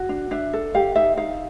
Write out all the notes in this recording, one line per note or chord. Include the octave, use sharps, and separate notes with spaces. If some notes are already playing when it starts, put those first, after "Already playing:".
Already playing: F#4
D4
D4 E5
A4
G4 F5
D#4 E5
D#4 F5